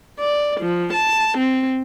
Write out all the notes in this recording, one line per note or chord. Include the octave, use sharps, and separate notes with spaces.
D5
F3
A5
C4